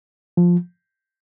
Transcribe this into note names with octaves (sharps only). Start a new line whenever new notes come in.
F3